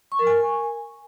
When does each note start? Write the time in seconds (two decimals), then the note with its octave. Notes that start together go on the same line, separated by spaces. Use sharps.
0.12 C#6
0.19 A#4
0.27 G#5